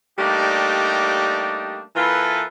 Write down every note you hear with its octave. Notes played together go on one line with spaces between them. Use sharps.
G3 A3 A#3 D4 D#4 G4
E3 A#3 E4 F4 A4 B4